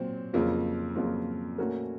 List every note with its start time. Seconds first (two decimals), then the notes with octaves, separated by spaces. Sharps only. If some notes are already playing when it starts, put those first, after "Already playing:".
Already playing: A#2 F#3 C4
0.34 F2 C#3 F#3 A#3 F4
0.95 F2 C#3 F#3 A#3 F4
1.58 A#2 A3 C#4 F#4 A#4